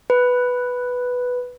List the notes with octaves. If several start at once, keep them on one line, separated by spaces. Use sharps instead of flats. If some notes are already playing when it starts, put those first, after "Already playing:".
B4